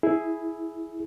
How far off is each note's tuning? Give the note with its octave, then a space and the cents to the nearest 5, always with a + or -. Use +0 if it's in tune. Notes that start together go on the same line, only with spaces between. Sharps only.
E4 +0 G#4 +10